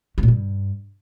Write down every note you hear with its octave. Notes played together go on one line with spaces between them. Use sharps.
A3
A#2
G2